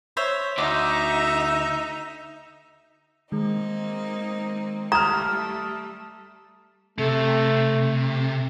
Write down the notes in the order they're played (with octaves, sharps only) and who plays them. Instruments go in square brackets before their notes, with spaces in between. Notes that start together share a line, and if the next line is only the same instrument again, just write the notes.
[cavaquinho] C5 C#5 E5
[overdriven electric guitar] D2 [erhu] D#4 [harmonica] E5 [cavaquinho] D6
[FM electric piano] D#3 G#3 [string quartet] A#3 C4 D#4
[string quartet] G3 A3 [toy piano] A#5 [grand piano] D#6 F6
[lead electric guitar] C3 [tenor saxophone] A3